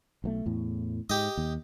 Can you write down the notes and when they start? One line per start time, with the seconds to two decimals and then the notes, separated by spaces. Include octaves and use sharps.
0.24 B1 E3 A3
0.46 E2 A2
1.10 G#2 G4 D#5
1.37 D#2